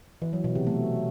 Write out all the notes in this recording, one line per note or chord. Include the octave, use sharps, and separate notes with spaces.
E3
F#3
B2
C3
A3